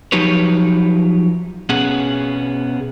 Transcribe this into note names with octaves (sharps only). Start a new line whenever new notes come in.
F3 F#3 D#4 G4 B4 C#5
B2 B3 C#4 G#4 F#5